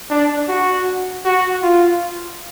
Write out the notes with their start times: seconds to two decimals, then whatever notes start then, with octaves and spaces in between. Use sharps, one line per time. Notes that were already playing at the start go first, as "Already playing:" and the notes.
0.10 D4
0.48 F#4
1.25 F#4
1.63 F4